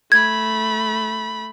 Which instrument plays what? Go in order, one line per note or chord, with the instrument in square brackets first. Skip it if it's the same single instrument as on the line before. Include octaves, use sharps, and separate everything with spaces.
[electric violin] A3 B5 [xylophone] G#6